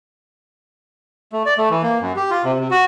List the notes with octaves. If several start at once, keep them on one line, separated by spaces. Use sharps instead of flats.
A3
D5
A3
E3
A#3
F#2
G4
F4
C3
C3
F#4